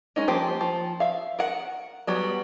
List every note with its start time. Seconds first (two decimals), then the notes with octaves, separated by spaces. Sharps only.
0.16 G#3 C#4 D#4
0.28 F3 A#3 G4 C5
0.61 F3
1.00 E5 F5
1.39 A#4 F#5
2.07 F#3 G3 B3